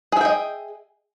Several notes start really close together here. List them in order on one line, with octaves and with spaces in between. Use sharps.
G#4 E5 G5 D#5